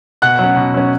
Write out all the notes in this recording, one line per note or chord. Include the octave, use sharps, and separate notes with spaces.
B2 F#5 F#6
F#3 C#4
B2
F#3 C#4